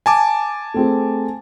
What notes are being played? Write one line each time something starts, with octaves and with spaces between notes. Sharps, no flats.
G#5 A5 D6
A3 C4 G#4